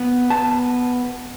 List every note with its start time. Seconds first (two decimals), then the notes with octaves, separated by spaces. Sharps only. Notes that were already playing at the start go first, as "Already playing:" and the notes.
Already playing: B3
0.30 B3 A5